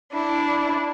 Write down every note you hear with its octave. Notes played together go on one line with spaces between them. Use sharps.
D4 E4